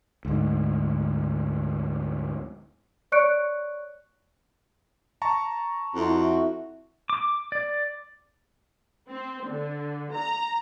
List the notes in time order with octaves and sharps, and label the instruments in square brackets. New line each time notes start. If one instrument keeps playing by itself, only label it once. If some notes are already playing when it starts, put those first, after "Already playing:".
[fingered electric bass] D2 G#2
[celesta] C#5 D5 C#6 F#6 C#7 D7
[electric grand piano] A5 A#5 C#6
[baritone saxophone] F2 [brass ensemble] E4 F#4
[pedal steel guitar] D6
D5
[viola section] C4
D3
A#5